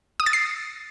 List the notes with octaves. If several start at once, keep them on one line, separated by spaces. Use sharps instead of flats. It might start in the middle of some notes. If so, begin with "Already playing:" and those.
D#6
A6
C7